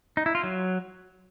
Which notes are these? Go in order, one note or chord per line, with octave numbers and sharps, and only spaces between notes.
D#4
E4
F4
F#3